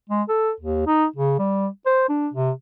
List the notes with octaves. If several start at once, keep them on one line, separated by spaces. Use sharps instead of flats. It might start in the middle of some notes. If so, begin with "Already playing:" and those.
G#3
A4
D#2
D#4
C#3
G3
C5
D4
C3